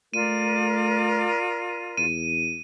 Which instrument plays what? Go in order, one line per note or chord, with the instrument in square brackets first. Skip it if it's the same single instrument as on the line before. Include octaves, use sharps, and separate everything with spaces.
[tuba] A3 [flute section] F4 A#4 D5 [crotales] D#7
[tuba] E2 [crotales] D#7